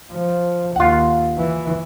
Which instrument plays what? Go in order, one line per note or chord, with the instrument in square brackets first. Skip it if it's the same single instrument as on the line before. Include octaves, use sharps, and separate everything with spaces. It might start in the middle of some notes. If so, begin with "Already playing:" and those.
[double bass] F3
[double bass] D#2 [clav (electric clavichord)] F4 F#5
[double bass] E3